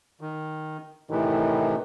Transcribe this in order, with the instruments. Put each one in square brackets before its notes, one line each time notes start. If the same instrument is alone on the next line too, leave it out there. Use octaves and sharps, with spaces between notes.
[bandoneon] D#3
[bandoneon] A2 C3 E3 [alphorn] D#3